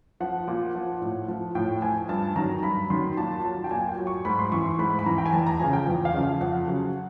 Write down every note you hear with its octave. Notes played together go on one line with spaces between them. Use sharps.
F3 F#5
A#2
F3
A2
F3
A2 G5
F3 G#5
G2 A5
D#3 F#3 A#5
G2 B5
D#3 F#3 C6
A#2 A5
F#3 A5
G5
A#2 G#5
G5
F#3
C#6
G#2 B5
C6
E3 C#6
C6
G#2 B5
B5
E3 A#5
G5
G#5
E2 A5
A#5
C#3 F3 G#5
G5
E2
F5
C#3 F3
F5
F2 F#5
C#3 F#3